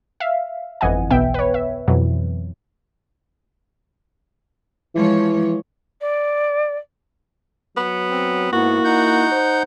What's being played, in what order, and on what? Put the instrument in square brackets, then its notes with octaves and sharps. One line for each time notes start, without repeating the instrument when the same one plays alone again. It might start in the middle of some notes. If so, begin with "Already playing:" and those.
[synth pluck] E5 F5
G1 F2 E3 D#5 F#5 G#5
B1 B2 B3 E5 G5
B4 C#5
E5
F2 B2 E3 F#3
[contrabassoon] E3 [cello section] F3 G#3 C#5
[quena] D5
[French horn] F#3 [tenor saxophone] B3
[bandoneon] C4
[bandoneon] G#2 B3 [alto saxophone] A#3 [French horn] E4 [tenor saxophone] F#4
[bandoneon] D#4 F#5 G6
[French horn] C5